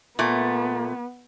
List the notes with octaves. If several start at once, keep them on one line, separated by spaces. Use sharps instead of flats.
A#2 A3 B3